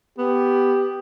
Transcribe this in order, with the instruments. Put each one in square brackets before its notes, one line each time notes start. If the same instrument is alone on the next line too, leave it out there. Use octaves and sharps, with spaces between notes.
[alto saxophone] B3 [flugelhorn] G4